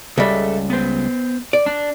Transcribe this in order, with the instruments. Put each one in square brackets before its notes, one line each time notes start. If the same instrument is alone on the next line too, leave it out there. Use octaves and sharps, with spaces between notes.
[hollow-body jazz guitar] C#2 G3 [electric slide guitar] G#4 A4 E5
[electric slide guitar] B3 C5
[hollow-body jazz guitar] D5
[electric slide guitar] D4